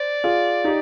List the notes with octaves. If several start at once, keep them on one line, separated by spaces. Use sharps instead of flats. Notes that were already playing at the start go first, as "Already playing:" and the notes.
Already playing: C5 D5
F4 G#4
D#4 G4